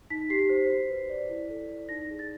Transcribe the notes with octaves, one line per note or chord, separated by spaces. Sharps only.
D#4 B6
G4 C7
B6
C5
F#4
B4
D5
E4
A4
D5
D#4 A#6
G#4
A6